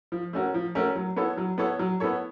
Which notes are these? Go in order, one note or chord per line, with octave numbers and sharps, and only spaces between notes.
F3
A3 C#4 F#4 A#4
F3
A3 C#4 F#4 A#4
F#3
B3 E4 A4 C#5
F#3
B3 E4 A4 C#5
F#3
B3 E4 A4 C#5